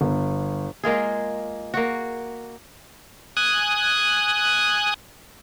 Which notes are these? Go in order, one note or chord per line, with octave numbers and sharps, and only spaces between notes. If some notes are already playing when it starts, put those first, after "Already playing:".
G1
G#3 A#3 F4 G#4
A#3 F#4
G#5 D#6 F#6